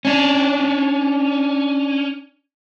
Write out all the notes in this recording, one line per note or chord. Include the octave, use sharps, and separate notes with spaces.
C#4 D4